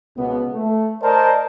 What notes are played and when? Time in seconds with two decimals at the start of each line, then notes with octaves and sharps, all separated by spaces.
0.17 C#2 B2 B3
0.53 A3
1.02 A#4 C5 D5 D#5 A5